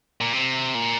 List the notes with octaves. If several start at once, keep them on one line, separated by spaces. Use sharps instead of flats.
A#2
C3
A#2